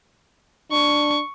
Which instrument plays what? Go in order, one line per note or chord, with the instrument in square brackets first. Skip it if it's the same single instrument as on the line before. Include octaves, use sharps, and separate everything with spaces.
[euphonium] D4 [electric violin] C#6